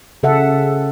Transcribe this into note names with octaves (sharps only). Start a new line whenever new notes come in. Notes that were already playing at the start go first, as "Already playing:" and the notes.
C#3 A4 E5 F#5